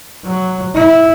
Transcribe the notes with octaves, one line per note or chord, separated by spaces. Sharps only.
F#3
E4